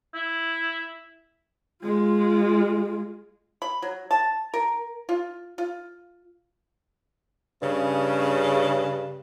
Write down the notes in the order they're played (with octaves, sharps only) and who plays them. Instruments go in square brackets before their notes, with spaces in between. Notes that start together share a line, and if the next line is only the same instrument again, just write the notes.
[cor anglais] E4
[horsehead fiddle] G#3 F4
[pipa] B5
F#3
A5
A#4
F4
F4
[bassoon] G2 [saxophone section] C#3